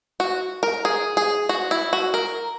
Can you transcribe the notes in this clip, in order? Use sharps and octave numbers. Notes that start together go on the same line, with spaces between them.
F#4
A#4
G#4
G#4
F#4
E4
F#4
A#4